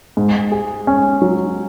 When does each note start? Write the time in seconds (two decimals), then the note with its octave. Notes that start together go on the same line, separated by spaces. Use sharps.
0.17 G#2
0.52 G#4
0.87 C#4
1.22 F#3